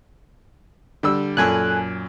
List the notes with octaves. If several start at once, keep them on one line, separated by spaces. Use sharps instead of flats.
D3 G3 E6
F#2 A#2 A4 G#5 F#6